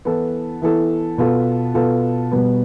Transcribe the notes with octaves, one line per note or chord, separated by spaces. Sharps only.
E3 B3 E4 A4
E3 B3 E4 A4
B2 B3 F4 A4
B2 B3 F4 A4
B2 G3 B3